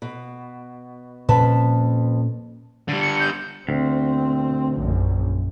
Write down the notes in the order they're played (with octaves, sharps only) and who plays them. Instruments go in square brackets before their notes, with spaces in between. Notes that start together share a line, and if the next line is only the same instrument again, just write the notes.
[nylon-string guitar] B2
[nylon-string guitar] F2 B4 A5 [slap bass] A#2 C#4
[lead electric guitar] D3 G3
[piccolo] C#7
G6
[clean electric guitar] D2 [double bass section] B2 C4
[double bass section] A#1 F#2